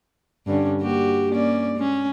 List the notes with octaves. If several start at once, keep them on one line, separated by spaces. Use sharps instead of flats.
G2 D3 C#4
A#3 F#4 G4
A#3 C#4 D5
G#3 C#4